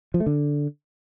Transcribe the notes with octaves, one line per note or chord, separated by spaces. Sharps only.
F3
A3
D3